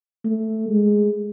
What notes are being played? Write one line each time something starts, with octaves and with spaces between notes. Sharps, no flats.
A3
G#3